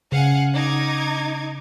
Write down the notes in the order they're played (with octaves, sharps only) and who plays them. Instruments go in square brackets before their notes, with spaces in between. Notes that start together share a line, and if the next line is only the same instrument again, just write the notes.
[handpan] C#3 [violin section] F5 F#5 G#5
[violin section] D#4 D6 G#6